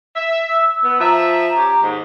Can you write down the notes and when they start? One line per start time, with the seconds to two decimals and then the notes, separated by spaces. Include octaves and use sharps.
0.16 E5
0.50 E6
0.84 B3
1.00 F3 E5 A#5
1.57 C#4 G4
1.83 D#2 G#2